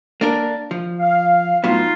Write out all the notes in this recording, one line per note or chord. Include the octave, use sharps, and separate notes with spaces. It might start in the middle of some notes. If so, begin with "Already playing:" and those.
A#3 D4 A#4
F3
F5
A2 F#3 B3 D#4 F4